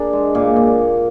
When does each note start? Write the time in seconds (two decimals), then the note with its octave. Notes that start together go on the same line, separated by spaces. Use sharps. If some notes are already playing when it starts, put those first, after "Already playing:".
Already playing: D4 G#4 A#4
0.13 G#3
0.35 A#2 G#4
0.56 A#2